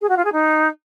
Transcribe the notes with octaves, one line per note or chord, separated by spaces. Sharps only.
G#4
F#4
F4
G#4
D#4